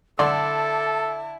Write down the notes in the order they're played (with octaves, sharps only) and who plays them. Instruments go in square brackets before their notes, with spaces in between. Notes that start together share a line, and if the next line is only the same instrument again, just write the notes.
[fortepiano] D3 D5 C6 [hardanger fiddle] E4 [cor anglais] A4 [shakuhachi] A5